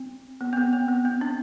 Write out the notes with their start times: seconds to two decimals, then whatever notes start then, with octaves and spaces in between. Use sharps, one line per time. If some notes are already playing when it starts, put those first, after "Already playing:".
Already playing: C4
0.41 B3
0.53 C4
0.57 B3
0.73 C4
0.88 B3
1.05 C4
1.21 D4